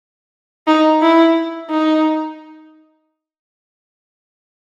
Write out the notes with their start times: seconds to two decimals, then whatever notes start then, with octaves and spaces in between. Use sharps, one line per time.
0.67 D#4
1.02 E4
1.70 D#4